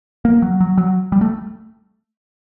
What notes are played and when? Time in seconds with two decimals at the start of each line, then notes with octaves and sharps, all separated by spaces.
0.25 A#3
0.42 F#3
0.60 F#3
0.77 F#3
1.12 G3
1.21 A3